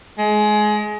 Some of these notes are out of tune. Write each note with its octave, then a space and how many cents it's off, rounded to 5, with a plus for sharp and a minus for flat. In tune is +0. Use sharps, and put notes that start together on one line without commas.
G#3 +25